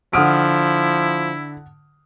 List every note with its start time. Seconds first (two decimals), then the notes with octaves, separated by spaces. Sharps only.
0.13 D3 F3 E4 F#5 D#6 F6 D7